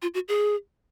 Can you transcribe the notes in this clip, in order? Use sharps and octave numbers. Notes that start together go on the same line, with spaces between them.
F4
F#4
G#4